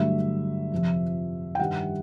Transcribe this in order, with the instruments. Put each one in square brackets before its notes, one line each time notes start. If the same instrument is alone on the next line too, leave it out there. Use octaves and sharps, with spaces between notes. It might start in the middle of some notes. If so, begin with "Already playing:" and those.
Already playing: [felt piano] G2 D3 F#3 A3 E5
F2 C3 F3
G5
G2 D#3 G3 F#5